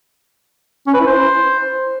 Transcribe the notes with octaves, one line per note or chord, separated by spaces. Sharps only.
C#4
B4
E4
C5